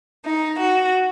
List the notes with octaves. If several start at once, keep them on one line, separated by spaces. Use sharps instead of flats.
D#4
F#4